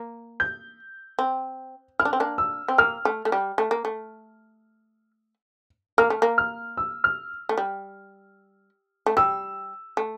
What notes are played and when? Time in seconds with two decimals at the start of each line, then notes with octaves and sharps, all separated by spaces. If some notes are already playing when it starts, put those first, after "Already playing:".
Already playing: A#3
0.40 G6
1.19 C4
1.99 E4 F6
2.05 D4
2.13 C4
2.20 A#3 D4
2.38 E6
2.68 C4
2.78 A#3 F6
3.05 A3
3.25 A3
3.32 G3
3.58 A3
3.71 A#3
3.85 A3
5.98 A#3 F6
6.10 A3
6.22 A#3
6.38 F6
6.77 E6
7.04 F6
7.49 A3
7.58 G3
9.06 A3
9.17 G3 E6
9.97 A3